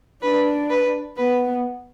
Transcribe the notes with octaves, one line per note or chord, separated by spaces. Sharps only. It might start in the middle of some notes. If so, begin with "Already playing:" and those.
D4 B4
B4
B3 B4